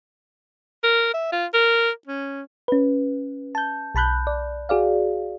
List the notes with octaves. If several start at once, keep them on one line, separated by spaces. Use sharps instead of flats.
A#4
E5
F4
A#4
C#4
C#4 B4
A5 G6
B1 A5 B5 F#6 G6
D5
F#4 G#4 D5 F5